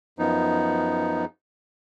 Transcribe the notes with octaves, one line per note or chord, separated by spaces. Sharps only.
F#2 F3 B3 D#4